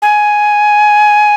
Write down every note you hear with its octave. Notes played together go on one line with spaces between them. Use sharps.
G#5